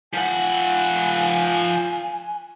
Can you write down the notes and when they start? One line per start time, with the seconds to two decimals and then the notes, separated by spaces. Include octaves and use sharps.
0.13 F3 F#5 G#5